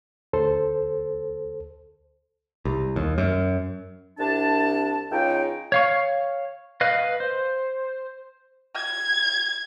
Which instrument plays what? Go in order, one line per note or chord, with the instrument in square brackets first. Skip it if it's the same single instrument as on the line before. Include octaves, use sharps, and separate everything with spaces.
[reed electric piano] D2 A4 C5
[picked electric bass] C2
D#2
F#2
[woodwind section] C2 D4 A5
C#2 D#4 G5
[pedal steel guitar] C#5 F5 C#6
B4 D#5 F5
C5
[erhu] G#6